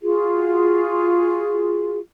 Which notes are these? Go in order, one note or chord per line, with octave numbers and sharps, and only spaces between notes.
F4 F#4 G#4